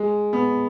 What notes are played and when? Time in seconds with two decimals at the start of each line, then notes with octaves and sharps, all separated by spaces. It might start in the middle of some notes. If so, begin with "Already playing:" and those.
Already playing: G#3
0.33 B3